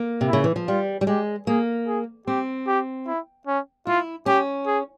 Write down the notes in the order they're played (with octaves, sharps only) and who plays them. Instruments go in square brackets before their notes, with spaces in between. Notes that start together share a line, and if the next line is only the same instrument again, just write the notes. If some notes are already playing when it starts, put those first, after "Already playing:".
Already playing: [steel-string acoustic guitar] A#3
C3
[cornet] E4
[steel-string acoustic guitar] C#3
E3
F3
[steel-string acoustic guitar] G3 [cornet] F4
[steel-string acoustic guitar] G3
[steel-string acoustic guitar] G#3 [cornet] G4
[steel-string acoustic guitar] A#3 [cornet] G#4
[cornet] G#4
[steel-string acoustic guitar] C4 [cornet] G4
[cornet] G4
E4
C#4
[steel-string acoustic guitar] E4 [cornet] F4
[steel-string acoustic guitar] C#4 [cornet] G4
[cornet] G#4